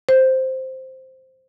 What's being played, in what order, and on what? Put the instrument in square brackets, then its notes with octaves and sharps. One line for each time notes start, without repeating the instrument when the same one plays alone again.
[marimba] C5